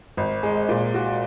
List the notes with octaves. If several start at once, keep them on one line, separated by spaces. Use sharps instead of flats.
G#1
G#3
A#2
F#4